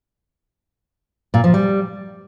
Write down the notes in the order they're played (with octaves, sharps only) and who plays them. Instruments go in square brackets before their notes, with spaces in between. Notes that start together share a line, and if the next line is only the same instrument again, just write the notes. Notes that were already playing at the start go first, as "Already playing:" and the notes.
[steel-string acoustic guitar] A#2
F3
G3